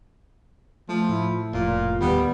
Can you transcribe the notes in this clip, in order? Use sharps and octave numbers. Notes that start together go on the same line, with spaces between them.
F3 A3
A2 E4
F1 A#2 F4
D#2 D#3 G3 B3